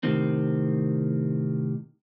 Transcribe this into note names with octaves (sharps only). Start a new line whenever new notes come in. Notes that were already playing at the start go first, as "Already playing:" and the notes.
A2 C3 D#3 C4